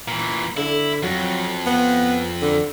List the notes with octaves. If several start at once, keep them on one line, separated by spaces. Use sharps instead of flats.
A#2 E3
D3 E4
F2 F#3
B3
D3